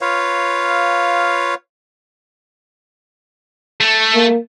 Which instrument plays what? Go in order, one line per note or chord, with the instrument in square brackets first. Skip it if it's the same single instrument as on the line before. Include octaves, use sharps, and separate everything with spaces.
[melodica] F4 B4 C#5 F5
[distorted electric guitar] A3
[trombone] A#3